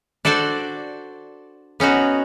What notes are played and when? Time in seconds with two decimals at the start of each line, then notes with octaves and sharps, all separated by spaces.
0.25 D4 F#4 A4 C5 D5
1.80 B3 C#4 D#4 F#4